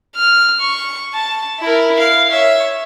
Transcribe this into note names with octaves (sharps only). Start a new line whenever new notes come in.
F6
C#6
A5
E4 A#4
F5
C#5 E5